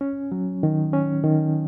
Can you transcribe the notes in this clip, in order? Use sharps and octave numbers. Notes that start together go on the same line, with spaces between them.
C#4
F#3
D#3
C#4
D#3